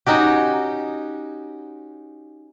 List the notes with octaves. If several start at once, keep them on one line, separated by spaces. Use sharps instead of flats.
C#4 D#4 F#4 G4